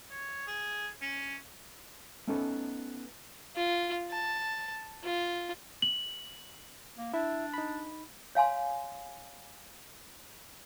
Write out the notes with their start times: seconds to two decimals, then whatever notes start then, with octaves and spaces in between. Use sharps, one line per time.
0.11 C#5
0.48 G#4
1.02 C#4
2.27 A3 B3 C#4 D#4 A4 B4
3.55 F4
4.11 A5
5.03 F4
5.82 F#7
6.97 A#3
7.14 D4 E4 E5
7.54 D#4 B5
8.35 C#5 F5 G#5 C6